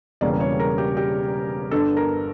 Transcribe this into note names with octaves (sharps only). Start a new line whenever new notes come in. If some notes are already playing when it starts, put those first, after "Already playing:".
E1 E2 C#3 G3 A#3 D5
C#5
A#4
G4
G4
G1 G2 D3 A4
A#4